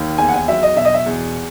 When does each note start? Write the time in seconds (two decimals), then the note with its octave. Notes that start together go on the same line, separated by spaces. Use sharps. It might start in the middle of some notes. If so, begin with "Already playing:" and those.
Already playing: D#2 D#3
0.18 E2 G#5
0.28 F#5
0.34 G#5
0.48 F#3 E5
0.63 D#5
0.76 B2 E5
0.85 D#5
0.94 E5
1.06 E2